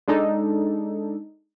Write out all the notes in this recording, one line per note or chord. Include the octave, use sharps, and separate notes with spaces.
G#3 D4 D#4 A4